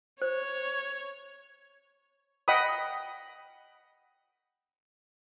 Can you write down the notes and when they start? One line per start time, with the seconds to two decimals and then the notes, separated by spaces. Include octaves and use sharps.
0.22 C5 C#5
2.48 D#5 F#5 G5 B5 D#6